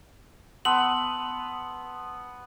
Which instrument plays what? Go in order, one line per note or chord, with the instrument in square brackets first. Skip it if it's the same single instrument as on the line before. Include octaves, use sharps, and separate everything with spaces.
[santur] B3 [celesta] A5 C6 E6 [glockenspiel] F#7